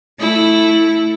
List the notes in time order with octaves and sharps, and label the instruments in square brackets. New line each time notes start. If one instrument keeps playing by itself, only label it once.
[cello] A3 [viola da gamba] E4